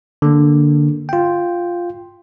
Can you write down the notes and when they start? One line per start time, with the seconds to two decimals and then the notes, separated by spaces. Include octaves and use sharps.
0.22 D3 A#3
1.09 F4 G5